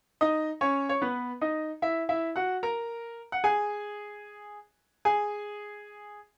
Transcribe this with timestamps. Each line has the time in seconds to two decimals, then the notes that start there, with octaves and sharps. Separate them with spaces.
0.21 D#4 D#5
0.61 C#4 C#5
0.89 C#5
1.02 B3 B4
1.41 D#4 D#5
1.82 E4 E5
2.09 E4 E5
2.36 F#4 F#5
2.63 A#4 A#5
3.32 F#5
3.44 G#4 G#5
5.05 G#4 G#5